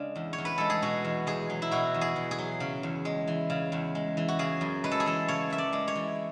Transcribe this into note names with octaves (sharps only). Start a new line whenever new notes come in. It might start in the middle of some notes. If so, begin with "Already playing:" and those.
Already playing: C#3 G#3 D4
E2
C#5
E2
B4
G#3 A4
G#4
B2 F#4
E2
E2 G#4
F#3
E4
B2 F#4
E2
G#4
E2
G#4
F#3
C#3
E2
G#3
E3
C#3
E2
G#3
E3
F#4
C#3 G#4
F#2
G#3 B4
A4
G#4
E3 A4
C#3 C#5
F#2 E5
D5
G#3
C#5
E3